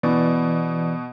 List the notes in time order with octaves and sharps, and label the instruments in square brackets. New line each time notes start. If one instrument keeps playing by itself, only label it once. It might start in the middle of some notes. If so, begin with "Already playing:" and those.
[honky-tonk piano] B2 [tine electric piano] E3 D5